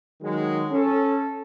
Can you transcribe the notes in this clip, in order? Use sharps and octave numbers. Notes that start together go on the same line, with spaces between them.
D#3 F#3 G#3
C#4 A4